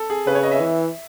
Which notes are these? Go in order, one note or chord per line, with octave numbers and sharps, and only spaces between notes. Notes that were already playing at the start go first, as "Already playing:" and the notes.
Already playing: A4
G#4
C#3 B4
C#5
D#5
E5
E3